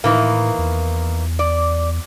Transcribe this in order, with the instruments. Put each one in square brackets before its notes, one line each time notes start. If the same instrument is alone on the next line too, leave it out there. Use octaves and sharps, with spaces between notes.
[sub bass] A2 [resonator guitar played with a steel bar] D#3 E3 A#3
[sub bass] E2
[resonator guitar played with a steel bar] D5